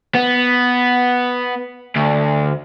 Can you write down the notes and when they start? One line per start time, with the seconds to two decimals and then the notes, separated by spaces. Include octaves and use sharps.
0.15 B3
1.96 D2